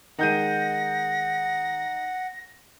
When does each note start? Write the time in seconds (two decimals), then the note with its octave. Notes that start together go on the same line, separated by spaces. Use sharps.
0.19 D#3 G#3 D#4 F#5 G6 A#6 D#7